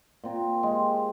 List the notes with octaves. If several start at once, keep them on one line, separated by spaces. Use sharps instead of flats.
A#2 C4
G#3 G4